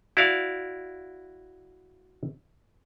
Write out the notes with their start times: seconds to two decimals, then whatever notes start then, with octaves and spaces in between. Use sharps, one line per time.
0.17 E4 F#4 D5 F5